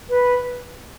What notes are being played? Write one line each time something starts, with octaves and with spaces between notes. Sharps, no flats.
B4